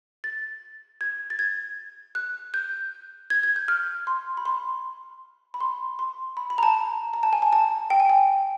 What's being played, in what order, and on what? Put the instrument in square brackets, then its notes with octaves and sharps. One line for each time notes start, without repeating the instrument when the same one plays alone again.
[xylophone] A6
G#6
A6
G#6
F#6
G6
G#6
G#6
G6
F6
C6
B5
C6
B5
C6
C6
B5
B5
A#5
A5
A#5
A5
G#5
A5
A5
G5
G#5
G5